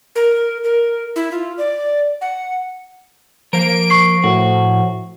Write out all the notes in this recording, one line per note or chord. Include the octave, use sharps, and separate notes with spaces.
A#4
A#4
E4
F4
D5
F#5
F3 A#3 A#4 D7
C#6 C7
A2 F#4